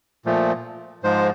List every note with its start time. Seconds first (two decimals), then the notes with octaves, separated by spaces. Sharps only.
0.25 A#2 F3 A3
1.03 G#2 F3 G#3 C5